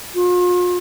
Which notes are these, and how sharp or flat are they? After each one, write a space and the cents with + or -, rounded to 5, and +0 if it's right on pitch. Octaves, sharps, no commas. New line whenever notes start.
F4 +40